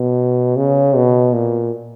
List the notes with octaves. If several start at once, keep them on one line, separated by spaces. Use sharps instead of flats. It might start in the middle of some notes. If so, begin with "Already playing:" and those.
Already playing: B2
C#3
B2
A#2